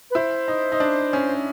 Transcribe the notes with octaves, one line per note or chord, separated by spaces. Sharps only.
B4
E4 C5
D#4
D#4
D4
C#4